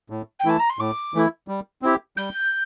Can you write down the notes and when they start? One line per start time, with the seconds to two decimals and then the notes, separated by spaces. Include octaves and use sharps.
0.10 A2
0.39 G5
0.45 E3 A3 E4 A5
0.59 A#5
0.69 C6
0.79 A2 D6
1.14 E3 A3 E4
1.48 G3
1.82 C4 E4 G4
2.16 G3 G6